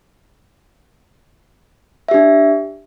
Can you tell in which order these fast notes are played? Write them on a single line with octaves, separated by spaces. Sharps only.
E5 G4 D4